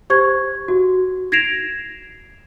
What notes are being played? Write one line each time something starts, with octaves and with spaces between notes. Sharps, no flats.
G4 C5 C#6 G#6
F#4
G#6 A#6 C7 D7 E7 F7